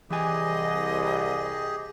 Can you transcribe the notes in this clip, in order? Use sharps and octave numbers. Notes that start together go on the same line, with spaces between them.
C2 E3 G4 G#4 D#5 G#5